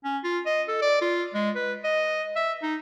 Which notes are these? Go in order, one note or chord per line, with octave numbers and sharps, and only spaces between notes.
C#4
F4
D#5
A4
D5
F4
G#3
B4
D#5
E5
D#4